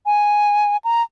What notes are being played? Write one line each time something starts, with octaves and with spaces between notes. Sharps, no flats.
G#5
A#5